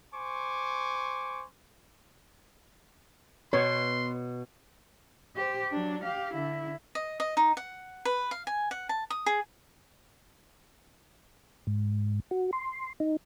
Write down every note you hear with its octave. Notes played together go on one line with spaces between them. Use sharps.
C5 G#5 C#6 D6
B2 B3 C#5 C6
G4 C5
F#3 D4
G4 F5
D3 E4
D#5
D#5
D#4
F#5
B4
F5
G#5
F#5
A5
D#6
G#4
G#2
F#4
C6
D#4